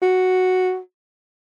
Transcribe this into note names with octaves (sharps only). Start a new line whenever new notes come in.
F#4